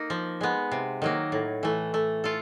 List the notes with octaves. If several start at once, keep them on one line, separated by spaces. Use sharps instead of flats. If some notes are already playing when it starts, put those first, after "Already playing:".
Already playing: A#3 D#4
F3
G#3 B3
C3
D#3 F#3 A#3
A2
E3 A3
A3
F4 A4